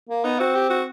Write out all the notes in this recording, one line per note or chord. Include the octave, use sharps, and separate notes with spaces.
A#3
B3 D#4
C4 F#4
G4
F#4